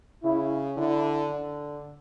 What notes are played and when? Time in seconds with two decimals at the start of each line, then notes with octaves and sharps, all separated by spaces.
0.24 C#3 E4
0.77 D3 E4
1.30 D3